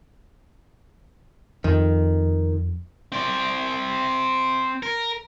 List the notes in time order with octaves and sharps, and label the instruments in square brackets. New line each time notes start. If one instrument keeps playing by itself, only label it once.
[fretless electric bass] F2 [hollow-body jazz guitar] D#3
[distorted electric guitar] C4 D5
A#4